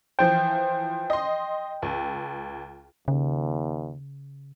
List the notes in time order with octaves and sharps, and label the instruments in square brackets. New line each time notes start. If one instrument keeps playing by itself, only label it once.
[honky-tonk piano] E3 F3 C5 [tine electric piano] G5
[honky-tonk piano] D#5 C6
C#2
[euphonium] D#2 [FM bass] C#3